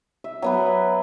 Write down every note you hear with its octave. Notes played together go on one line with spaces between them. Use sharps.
E5
F#3 B3 B4